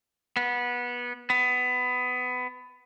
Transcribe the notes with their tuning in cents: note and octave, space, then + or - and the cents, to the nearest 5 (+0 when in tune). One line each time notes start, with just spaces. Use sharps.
B3 -20
B3 +20